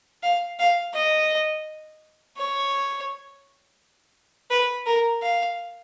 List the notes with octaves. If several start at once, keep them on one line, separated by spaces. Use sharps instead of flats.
F5
F5
D#5
C#5
B4
A#4
F5